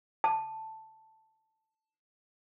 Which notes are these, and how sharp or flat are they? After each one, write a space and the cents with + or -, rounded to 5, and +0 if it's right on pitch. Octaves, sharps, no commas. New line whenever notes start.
A5 +0